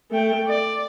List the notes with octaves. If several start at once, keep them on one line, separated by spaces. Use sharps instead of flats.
A3 G5
D5